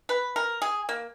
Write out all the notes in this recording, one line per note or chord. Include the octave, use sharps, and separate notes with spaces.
B4
A#4
G#4
A#3